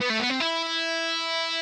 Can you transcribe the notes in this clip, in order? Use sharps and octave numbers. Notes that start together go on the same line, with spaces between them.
B3
A3
B3
C4
E4